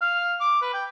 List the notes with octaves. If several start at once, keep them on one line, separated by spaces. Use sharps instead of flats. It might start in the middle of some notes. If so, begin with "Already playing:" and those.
F5
D6
B4
G5